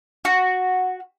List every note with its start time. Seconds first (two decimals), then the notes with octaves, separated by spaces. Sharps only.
0.25 F#4